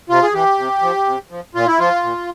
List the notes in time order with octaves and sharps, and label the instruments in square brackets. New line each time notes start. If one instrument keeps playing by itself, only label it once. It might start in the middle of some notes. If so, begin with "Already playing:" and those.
[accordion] C3 F4
G#4
E3 G4
C3
F3
C3
F3
A#2 F4
E4
F3 F4
A#2